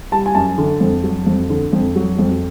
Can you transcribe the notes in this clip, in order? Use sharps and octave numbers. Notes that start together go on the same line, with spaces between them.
G3 A5
G#5
F#2 A5
D3
F2
F#3
F2
D3
F2
F#3
F2